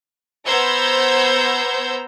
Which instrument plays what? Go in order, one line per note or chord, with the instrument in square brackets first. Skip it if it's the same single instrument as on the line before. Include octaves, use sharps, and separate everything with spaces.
[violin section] B3 C5 A#5 E6 G6 G#6